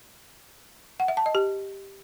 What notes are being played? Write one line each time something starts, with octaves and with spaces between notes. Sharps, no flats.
F#5
E5
A5
D#5
G4